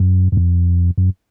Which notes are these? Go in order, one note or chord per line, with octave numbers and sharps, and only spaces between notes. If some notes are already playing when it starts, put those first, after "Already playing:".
Already playing: F#2
F#2
F2
F#2